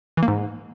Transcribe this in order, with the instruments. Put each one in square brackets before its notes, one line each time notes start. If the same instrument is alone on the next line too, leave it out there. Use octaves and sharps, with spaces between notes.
[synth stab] E3
A#3
G#2